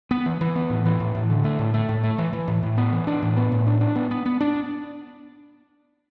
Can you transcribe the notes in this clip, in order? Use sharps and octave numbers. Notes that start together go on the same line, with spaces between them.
B3
E3
E3
B3
A2
E3
A2
A2
D3
A3
A2
A3
A2
A3
E3
E3
A2
A2
B3
E3
D4
A2
B3
A2
D4
D4
B3
B3
B3
D4